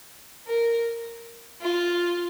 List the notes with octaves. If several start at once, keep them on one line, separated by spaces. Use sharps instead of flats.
A#4
F4